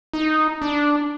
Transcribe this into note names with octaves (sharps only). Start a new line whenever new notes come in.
D#4
D4